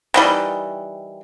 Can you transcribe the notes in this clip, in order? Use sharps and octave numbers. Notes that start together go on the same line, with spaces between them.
D#3 E3 G3